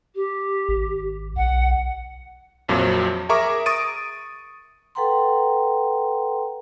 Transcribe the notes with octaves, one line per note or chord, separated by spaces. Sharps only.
G4
G#1
B1 F#5
A#1 F2 A#2 F3 F#3
G#4 A#4 E5 A#5 C#6 D6
C#6 D#6 A6 D7 D#7
A4 B4 F#5 G5 A#5 C6